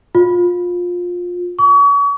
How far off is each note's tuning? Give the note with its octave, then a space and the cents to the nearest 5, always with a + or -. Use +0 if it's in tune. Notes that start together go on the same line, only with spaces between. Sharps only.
F4 +20
C#6 +40